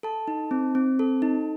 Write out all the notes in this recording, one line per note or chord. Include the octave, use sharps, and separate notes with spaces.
A4 A5
D#4
C4
C4
A4
D#4